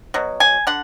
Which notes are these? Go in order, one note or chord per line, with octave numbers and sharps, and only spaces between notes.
B2 F#3
G#5
D3 F#5